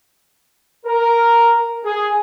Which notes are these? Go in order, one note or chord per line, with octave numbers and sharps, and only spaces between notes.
A#4
G#4